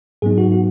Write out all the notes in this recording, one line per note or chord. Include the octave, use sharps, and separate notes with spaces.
G#2 F#3 B3 D#4 G#4
F#4
F#4